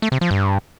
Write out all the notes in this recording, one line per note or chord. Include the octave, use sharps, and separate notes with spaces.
A3
C3
F3
G2